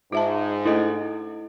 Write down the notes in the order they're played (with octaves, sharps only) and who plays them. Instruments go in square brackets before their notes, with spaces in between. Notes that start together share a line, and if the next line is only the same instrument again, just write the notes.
[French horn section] G#2 [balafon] F4 E5 A5
[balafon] A3 D4 [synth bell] E4 A4 D#5